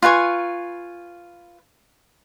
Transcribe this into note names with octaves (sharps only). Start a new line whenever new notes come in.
F4 B4 G#5 C#6